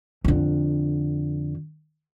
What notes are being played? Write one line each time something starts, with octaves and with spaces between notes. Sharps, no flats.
F2 D3